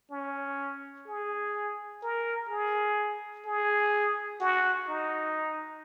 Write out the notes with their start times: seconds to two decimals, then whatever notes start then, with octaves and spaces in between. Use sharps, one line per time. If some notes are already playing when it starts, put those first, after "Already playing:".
0.11 C#4
1.07 G#4
2.02 A#4
2.49 G#4
3.46 G#4
4.41 F#4
4.89 D#4